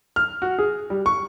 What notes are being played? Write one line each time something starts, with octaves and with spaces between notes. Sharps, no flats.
F6
F#4
G#4
G3
C#6